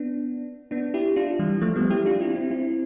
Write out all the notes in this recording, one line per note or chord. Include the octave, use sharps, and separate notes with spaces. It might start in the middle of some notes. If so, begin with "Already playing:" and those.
Already playing: B3 D4
B3 D4
E4 G4
D4 F4
E3 G3
F3 A3
G3 B3
E4 G4
D4 F4
C4 E4
C4 E4
C4 E4